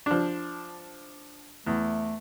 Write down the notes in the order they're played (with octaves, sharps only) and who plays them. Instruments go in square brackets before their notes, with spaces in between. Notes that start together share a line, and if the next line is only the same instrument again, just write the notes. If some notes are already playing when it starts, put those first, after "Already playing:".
[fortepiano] F3 D4
[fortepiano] E2 [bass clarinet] A3